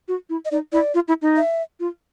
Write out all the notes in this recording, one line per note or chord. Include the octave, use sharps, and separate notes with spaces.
F#4
E4
D#5
D#4 D5
E4 D5
F4
E4
D#4
E5
F4